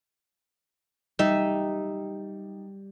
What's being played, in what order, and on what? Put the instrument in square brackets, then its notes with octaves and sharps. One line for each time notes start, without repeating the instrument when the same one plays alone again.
[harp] G3 [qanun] D#4 E5